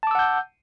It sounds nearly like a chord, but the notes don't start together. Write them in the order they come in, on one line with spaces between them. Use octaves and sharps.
A5 D6 E6 F#5 G6